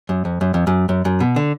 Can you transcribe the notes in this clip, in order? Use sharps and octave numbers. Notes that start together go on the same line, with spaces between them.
F#2
F2
F#2
F2
F#2
F#2
F#2
B2
D3